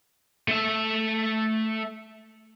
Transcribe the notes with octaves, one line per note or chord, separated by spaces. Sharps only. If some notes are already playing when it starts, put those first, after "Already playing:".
A3 E5